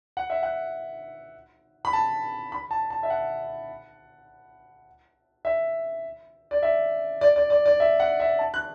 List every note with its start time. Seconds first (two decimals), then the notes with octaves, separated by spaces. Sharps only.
0.17 F#5
0.30 E5
0.43 F#5
1.85 B5
1.93 A5
2.52 B5
2.71 A5
2.90 A5
3.03 E5
3.10 F#5
5.45 E5
6.51 D5
6.63 E5
7.21 D5
7.36 D5
7.50 D5
7.66 D5
7.80 E5
8.00 F#5
8.20 E5
8.39 A5
8.54 F#6